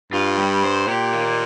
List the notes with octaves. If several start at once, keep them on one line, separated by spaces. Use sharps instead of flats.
G2 F4
G3
C5
A#2 G4
A#3